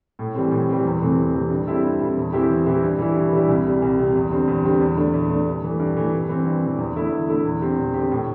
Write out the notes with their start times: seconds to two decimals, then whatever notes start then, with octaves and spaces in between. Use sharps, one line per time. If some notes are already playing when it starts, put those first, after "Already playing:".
0.19 A2
0.35 E3 G3 C4
0.51 A2
0.69 E3 G3 C4
0.85 E2
1.01 C3 E3 A3 C4
1.18 E2
1.34 C3 E3 A3 C4
1.50 G2
1.67 G3 C4 E4 A4
1.83 G2
2.00 G3 C4 E4 A4
2.17 E2
2.33 E3 C4 E4 G4
2.50 E2
2.66 E3 C4 E4 G4
2.83 G2
2.99 E3 G3 E4
3.15 G2
3.33 E3 G3 E4
3.48 C2
3.65 C3 G3
3.82 C2
3.99 C3 G3
4.15 E2
4.31 D3 G3 C4
4.48 E2
4.64 D3 G3 C4
4.81 E2
4.97 D3 A3 D4
5.13 E2
5.30 D3 A3 D4
5.46 G2
5.64 E3 A3
5.79 G2
5.97 E3 A3
6.12 G2
6.29 E3 C4
6.45 G2
6.62 E3 C4
6.78 E2
6.95 D3 A3 E4
7.12 E2
7.28 D3 A3 E4
7.45 E2
7.61 D3 C4 G4
7.78 E2
7.94 D3 C4 G4
8.11 A2